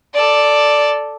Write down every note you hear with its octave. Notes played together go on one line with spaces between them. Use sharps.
A4 D5